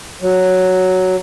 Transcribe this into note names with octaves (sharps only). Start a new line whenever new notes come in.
F#3